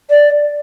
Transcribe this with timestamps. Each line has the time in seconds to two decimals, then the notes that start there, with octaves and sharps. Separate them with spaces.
0.10 D5